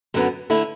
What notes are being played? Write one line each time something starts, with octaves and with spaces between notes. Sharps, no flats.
F#2 D3 F#3 B3
D3 A3 E4